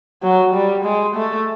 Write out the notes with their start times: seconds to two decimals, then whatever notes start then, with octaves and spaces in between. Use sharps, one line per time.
0.23 F#3
0.54 G3
0.84 G#3
1.16 A3